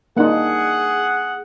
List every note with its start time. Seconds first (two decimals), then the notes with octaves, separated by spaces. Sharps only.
0.17 A#3 D4 D#4 G#4 F#5